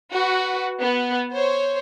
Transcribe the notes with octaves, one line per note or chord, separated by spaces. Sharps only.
F#4 B4
B3
C5 C#5